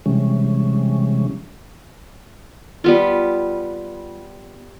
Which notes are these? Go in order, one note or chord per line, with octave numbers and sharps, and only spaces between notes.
C3 E3 G3 G#3 C#4
G3 B3 F4